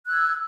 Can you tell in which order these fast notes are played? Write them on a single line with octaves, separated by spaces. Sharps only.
F#6 E6 G#6